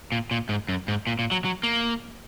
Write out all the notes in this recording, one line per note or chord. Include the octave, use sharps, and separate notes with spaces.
A#2
A#2
G#2
F#2
G#2
A#2
A#2
F#3
F#3
A#3